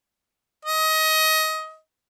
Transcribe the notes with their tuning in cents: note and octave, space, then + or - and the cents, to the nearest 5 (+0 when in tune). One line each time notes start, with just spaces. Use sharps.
D#5 +20